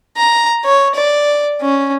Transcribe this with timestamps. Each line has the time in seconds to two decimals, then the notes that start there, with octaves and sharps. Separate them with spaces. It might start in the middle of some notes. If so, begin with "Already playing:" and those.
0.17 A#5
0.64 C#5
0.95 D5
1.61 C#4